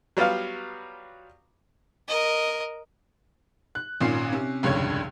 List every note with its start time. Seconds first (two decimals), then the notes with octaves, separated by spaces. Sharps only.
0.17 F#3 G3 B3 F4 F5
2.08 A#4 D#5
3.75 F#6
4.01 G#1 A#2 C#4 F4 C7
4.33 C3 C#4
4.63 F1 C#2 G2 D3 C#5 G#6